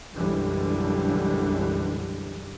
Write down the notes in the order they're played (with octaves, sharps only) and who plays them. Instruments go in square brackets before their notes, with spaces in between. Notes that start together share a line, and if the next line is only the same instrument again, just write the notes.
[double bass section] B1 F#2 D3 E3 G3 G#3